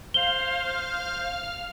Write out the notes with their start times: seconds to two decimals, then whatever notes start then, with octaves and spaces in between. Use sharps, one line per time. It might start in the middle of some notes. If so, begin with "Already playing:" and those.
0.14 C5 F5 F6 G7